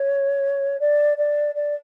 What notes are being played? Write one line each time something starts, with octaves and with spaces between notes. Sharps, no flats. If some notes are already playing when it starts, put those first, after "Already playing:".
Already playing: C#5
D5
D5
D5